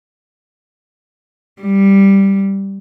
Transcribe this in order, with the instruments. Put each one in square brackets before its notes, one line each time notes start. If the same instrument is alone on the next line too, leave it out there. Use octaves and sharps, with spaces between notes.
[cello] G3